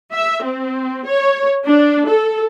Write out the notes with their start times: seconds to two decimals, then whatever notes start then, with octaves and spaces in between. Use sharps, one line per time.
0.12 E5
0.43 C4
1.07 C#5
1.65 D4
2.08 A4